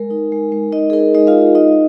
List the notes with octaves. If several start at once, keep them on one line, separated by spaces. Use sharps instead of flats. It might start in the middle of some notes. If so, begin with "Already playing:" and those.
Already playing: G#3 A#4
D#4
G#3
G#3
G#3 D#4 D#5
G#4
D#4 A#4
G#3 D#4 D#5
F4 F5
D#4
D#4 D#5